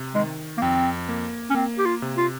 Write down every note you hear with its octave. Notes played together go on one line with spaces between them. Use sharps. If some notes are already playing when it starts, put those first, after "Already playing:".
Already playing: C3
D#3 G#3
A#3
F2 C4
A#3
C#4
A#3 C4
G4
F4
C3
F4